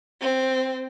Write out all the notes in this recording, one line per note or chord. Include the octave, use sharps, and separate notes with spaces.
C4